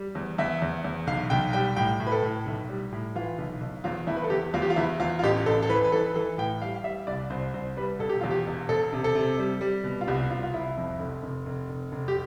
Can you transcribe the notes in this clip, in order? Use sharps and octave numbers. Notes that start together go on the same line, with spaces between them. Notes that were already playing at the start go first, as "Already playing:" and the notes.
Already playing: G3
E2
E2 E5
E2
E2
B1 F5
B1 G5
G3 G5
A2 G5
A2
B4
A4
A2
B1
G3
A2
E3 F4
B1
B1
E2 F4
E2 E4
B4
A4
E2 G4
E2 F4
G4
F4
E2 E4
E2 F4
F4
A1 G4
A1 A4
A4
E3 B4
B4
E3 A4
B4
E3 A4
A2 G5
G3 F5
F5
G3 E5
C2 D5
C2 C5
C2 C5
G3 B4
E1 A4
G4
E2 F4
G4
E1
E1 A4
C3
A4
C3
G3
G3
B2
F4
C2 G4
C2 F4
F4
C2 E4
F2
F1
F1
F1
F1
F1
G4